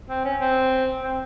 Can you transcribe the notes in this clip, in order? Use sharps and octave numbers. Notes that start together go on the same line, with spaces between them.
C4
C#4
C4
C4